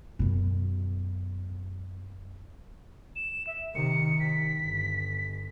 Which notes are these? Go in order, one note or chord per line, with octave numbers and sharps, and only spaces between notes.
F#2 B2
E7
E5
C3 D#3 C#7
B6
G1